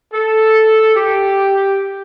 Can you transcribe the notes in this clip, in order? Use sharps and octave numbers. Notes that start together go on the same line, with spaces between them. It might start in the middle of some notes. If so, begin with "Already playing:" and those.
A4
G4